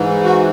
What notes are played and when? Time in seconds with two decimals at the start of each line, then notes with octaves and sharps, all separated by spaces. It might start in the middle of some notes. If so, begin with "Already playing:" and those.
Already playing: G#2 E3
0.25 F#4